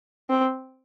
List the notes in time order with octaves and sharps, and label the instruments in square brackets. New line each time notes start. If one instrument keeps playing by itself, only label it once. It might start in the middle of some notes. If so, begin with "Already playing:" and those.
[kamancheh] C4